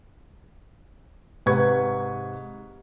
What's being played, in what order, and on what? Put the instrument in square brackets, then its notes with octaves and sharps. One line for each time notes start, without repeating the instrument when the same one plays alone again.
[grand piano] G#2 C3 B4 C#6 G#6